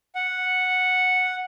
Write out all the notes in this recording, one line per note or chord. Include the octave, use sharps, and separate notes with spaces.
F#5